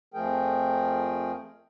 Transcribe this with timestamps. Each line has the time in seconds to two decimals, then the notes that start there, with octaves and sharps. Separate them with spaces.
0.14 F2 F3 A3 G#4 A#4 G5